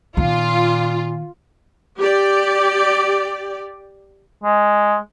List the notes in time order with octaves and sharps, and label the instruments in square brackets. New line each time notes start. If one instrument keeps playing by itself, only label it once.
[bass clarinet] A#2 [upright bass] D#3 B3 [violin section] F4
[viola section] G4 D5
[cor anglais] G#3